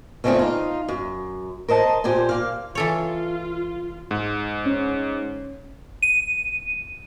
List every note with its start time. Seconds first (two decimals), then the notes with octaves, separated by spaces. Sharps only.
0.24 C#3 G#3 A3 C4 D4 F4
0.39 D#4 F4
0.88 F#2
1.68 A#4 C5 D#5 A5
2.04 A#2 G4 C5 G#5
2.29 A#3 F5
2.75 E3 F4 A4 C#5
4.11 G#2
4.65 C#4
6.02 D#7